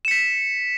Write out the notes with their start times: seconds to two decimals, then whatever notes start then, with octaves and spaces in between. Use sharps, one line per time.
0.05 E7
0.08 C#7
0.11 B6